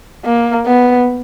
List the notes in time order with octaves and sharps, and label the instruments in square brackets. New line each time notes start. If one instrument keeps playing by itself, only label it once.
[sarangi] A#3
B3